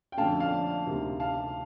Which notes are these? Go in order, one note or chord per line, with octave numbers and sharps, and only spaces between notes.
G5
F2 D3 A3 F5 A5
F5 A5
D2 C3 D#3
F5 A5